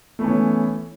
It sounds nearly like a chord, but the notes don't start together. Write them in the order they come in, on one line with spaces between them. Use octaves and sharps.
A3 B3 E3 C#4